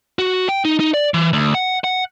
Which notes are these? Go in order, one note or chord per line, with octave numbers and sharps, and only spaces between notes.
F#4
G5
D#4
D#4
D5
E3
D2
F#5
F#5